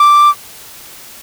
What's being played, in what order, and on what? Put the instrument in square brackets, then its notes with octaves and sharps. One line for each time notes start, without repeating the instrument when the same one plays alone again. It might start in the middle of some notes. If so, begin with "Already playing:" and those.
Already playing: [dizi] D6